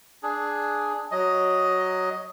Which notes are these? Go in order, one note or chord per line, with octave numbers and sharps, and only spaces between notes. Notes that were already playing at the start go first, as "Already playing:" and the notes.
D4 G#4
F#3 D#5